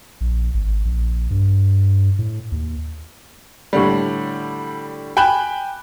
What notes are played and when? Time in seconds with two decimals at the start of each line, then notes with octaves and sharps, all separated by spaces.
0.21 A#1
0.54 G#1
0.85 A#1
1.31 G2
2.19 A2
2.52 D#2
3.73 A2 D3 G3
5.17 G5 G#5 B5 F#6 E7